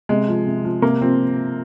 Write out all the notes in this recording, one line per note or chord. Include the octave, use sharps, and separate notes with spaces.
C3 G#3
F3
C3
F3
C3 A#3
F3 C4